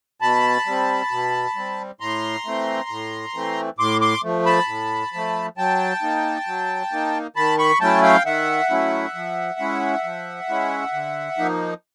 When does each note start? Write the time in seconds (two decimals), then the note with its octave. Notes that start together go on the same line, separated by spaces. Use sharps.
0.21 B2 A5 B5
0.66 G3 C4
1.11 B2
1.55 G3 C4
2.00 A2 A#5 C6
2.45 E3 A3 C4
2.90 A2
3.34 E3 A3 C4
3.78 A2 C6 D6
4.01 C6 D6
4.23 F3 A3
4.46 A5 B5
4.68 A2
5.13 F3 A3
5.57 F#3 G5 A5
6.02 A#3 D#4
6.47 F#3
6.92 A#3 D#4
7.36 D#3 A5 B5
7.58 B5 C#6
7.81 F#3 A3 C#4 E4 G5 A5
8.03 F5 G5
8.25 D#3 E5 F#5
8.70 F#3 A3 C#4 E4
9.15 F3
9.59 G#3 C#4 E4
10.04 F3
10.49 G#3 C#4 E4
10.93 D3
11.38 F3 A#3 D#4